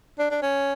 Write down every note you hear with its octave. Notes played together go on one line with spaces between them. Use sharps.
D4
D4
C#4